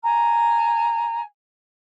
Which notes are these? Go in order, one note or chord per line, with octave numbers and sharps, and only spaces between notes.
G#5 A#5